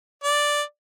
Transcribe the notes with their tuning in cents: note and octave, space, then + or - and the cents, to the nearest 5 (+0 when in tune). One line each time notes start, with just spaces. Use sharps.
D5 +0